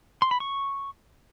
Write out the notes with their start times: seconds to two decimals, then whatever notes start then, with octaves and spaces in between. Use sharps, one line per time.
0.22 C6
0.31 B5
0.40 C#6